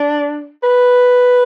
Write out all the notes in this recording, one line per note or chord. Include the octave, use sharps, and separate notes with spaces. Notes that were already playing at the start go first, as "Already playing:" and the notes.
Already playing: D4
B4